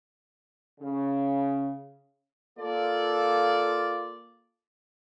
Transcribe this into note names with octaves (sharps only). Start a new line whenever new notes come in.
C#3
A#3 F4 A4 D5